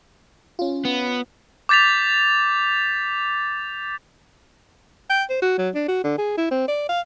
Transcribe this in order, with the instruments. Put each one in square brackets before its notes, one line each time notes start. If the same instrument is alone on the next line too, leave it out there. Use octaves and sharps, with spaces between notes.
[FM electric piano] C#4 F4
[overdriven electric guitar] B3
[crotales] D6 G6 A6 B6 F7
[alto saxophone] G5
C5
F#4
F#3
D4
F#4
D3
G#4
E4
C4
D5
F5